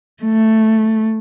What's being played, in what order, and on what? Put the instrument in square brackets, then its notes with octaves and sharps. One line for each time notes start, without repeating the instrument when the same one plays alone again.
[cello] A3